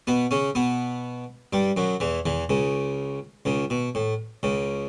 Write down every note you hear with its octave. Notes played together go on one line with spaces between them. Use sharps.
B2 B3
C#3 C#4
B2 B3
G2 G3
F#2 F#3
E2 E3
E2 E3
C#2 C#3
C#2 C#3
B2
A2
C#2 C#3